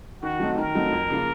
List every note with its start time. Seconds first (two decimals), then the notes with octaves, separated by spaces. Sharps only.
0.22 D#3 F#4
0.40 F#3 A3 C4 D#4
0.58 D#3 A#4
0.75 F#3 A3 C4 D#4
0.92 F2
1.10 C#3 F3 A#3 F4